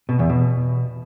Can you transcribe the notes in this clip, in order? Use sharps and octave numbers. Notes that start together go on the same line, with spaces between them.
B2
E2
B2